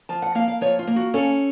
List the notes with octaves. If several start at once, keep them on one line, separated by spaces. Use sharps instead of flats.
F3 A5
F#5
A#3 F5
F5
F3 C#5
F4
A#3
F#4
C#4 A4